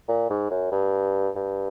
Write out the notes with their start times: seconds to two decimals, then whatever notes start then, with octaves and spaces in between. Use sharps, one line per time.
0.09 A#2
0.30 G#2
0.51 F#2
0.72 G2
1.36 G2